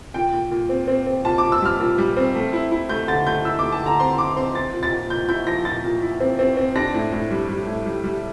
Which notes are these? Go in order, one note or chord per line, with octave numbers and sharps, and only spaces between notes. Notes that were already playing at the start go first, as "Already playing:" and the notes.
A#2 G5
A#2
A#2
C4
C4
C4
A#2 A5
D6
A#2
E6
G3 F6
A#2
G3
C4
A3
E4
E4
A3 G6
D3 A6
A3 G6
E4 E6
A3 D6
A5
D3 A#5
C4 C6
E4 D6
C4 C6
C4 A6
A#2
A6
A#2
A#2 G6
E4 G6
F3 A#6
A#2 A6
A#2
E4
C4
C4
C4
D4 A#6
A2
A2
G3
G3
A2
G3
G3